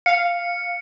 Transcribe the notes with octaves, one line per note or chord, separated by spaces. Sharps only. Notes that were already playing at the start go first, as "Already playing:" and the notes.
F5 C#7